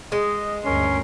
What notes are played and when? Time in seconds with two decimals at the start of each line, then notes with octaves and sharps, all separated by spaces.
0.12 G#3 D#5
0.65 D2 G2 C#4 A#4 C6